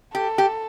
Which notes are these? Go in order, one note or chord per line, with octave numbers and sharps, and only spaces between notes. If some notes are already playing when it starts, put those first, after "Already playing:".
G4 A4
G4